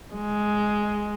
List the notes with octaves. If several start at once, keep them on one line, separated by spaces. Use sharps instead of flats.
G#3